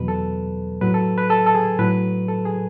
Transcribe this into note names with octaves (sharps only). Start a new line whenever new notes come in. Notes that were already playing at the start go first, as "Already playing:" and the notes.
Already playing: E2 B2 F#3 B4
A4
A2 F#3 B4
A4
B4
A4
A4
G#4
A2 F#3 B4
A4
G#4